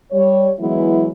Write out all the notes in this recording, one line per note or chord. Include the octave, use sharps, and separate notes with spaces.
G3 C#5
E3 F#3 G#3 B3 E4